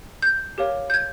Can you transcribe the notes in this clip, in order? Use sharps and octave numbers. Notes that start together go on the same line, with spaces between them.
G6
G4 A#4 C#5 F5
G6
G#6